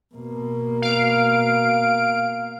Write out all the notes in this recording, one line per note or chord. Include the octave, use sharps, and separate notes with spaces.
B2 A#3
F5 D7